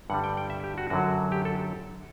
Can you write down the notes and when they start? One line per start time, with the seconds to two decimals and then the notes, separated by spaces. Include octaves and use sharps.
0.10 G2 D3 G3 F#5
0.24 G5
0.37 G5
0.50 E5
0.64 G4
0.78 F#4
0.90 F#2 D3 F#3 F#4
1.32 G4
1.45 A4